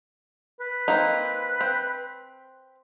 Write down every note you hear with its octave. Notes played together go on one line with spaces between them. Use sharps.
B4
A#3 C4 D#4
C4